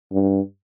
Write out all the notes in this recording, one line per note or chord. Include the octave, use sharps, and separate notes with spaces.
G2